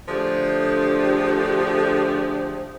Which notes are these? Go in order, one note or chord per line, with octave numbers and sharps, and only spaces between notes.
D3 F3 A3 D4 G4 G#4